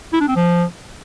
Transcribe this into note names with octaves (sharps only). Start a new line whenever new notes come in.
E4
D4
C4
F3